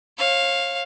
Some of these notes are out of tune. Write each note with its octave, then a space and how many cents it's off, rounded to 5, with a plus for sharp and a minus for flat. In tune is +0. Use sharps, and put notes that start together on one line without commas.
C#5 -35 F5 +0